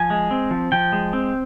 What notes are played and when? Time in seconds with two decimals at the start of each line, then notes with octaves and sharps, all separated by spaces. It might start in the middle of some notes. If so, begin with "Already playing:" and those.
Already playing: F3 G#5
0.10 G#3
0.31 C4
0.51 F3
0.72 F3 G5
0.92 G#3
1.13 C4